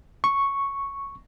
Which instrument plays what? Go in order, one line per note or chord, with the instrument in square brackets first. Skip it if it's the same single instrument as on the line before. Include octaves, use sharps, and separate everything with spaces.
[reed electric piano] C#6